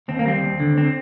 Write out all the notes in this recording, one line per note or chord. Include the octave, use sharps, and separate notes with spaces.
D#2 C4
A#3
G3 C4
D#2
D3
C4